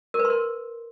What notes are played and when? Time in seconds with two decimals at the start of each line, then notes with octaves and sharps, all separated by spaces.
0.14 A#4
0.19 B4
0.25 C6
0.30 A#4